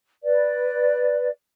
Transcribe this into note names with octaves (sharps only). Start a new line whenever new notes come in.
B4 D5